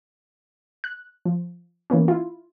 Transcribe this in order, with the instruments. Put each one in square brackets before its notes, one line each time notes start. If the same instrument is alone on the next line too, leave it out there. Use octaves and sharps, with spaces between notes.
[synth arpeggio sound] F#6
F3
E3 A#3 B3 C#4
E4 F4